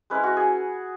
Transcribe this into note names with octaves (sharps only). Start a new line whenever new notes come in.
G#3 C#4 E4 B4
F#4
G#4